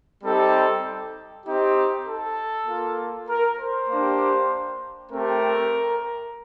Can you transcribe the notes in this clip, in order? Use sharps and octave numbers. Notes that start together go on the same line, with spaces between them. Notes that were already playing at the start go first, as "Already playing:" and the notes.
G3 C4 D#4 G4 A4
C4 D#4 G4
A4
A#3 F4
A#4
C5
A#3 D4 G4
A3 C4 G4 A#4